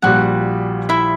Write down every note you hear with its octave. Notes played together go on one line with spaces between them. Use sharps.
A#1 A#2 G3 F#4 F#5
E4 E5